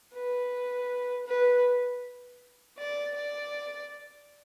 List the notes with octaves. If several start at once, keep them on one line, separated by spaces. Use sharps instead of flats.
B4
B4
D5
D5